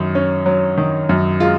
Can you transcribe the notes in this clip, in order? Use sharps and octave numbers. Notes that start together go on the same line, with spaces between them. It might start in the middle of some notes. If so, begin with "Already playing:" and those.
Already playing: F#2 D#3
C#4
F#3
D#3
F#2
G#3 F4